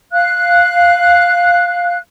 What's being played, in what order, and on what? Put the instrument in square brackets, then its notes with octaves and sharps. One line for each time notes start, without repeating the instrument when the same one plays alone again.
[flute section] F5 F#6